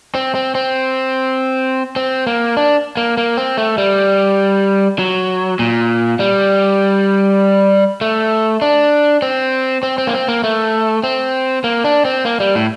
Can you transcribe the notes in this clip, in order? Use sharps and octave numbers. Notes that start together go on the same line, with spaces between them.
C4
C4
C4
C4
A#3
D4
A#3
A#3
C4
A3
G3
F#3
A#2
G3
A3
D4
C4
C4
C4
A#3
C4
A#3
A3
C4
A#3
D4
C4
A#3
G3
A2